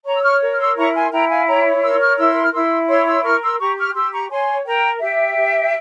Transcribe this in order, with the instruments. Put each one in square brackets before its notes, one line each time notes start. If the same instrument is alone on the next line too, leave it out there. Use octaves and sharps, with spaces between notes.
[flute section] C#5 A#5 C#6
E6
C#6 F6
A#4
F6
C6 E6
E4 A#5 C#6
G#5 C6
E4 G5 A#5
F5 G#5
C#5 G5 A#5
A#4 C6 E6
C#6 F6
E4 C6 E6
F6
E4 C6 E6
C#5 C6 E6
C6 E6
A#4 C#6 F6
C6 E6
G4 A#5 C#6
C#6 F6
G4 C6 E6
A#5 C#6
C#5 G#5 C6
A#4 G5 A#5
G4 E5 G5
G4